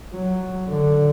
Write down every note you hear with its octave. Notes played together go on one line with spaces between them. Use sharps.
F#3
D3